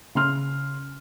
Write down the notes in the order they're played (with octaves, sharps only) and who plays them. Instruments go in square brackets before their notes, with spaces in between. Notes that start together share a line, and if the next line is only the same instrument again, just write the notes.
[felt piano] C#3 C6 F6